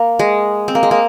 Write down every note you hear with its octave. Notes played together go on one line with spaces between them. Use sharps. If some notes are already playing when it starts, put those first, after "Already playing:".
Already playing: A#3
G#3
C4
A#3
G#3
A#3